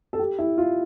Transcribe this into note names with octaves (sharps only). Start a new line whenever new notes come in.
A4
G4
E4
F4